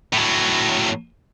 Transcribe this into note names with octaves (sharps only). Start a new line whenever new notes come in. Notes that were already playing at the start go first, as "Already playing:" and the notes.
A2 F#3